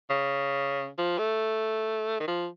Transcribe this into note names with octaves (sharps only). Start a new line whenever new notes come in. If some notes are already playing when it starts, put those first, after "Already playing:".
C#3
F3
A3
D#3
F3